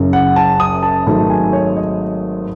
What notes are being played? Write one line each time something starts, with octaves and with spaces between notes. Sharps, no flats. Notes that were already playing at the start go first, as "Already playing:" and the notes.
Already playing: F#1 F#2 C#3
F#5
A5
D#6
A5
G#1 G#2 F#3 A3 D#4 A5
G#5
C#5
D#5